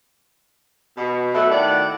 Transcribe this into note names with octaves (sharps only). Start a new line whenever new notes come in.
B2
B2 F#3 A3 E5 F#5
A2 D#3 D5 F#5